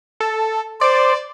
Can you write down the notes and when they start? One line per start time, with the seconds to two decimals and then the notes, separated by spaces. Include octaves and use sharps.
0.20 A4
0.81 C5 D5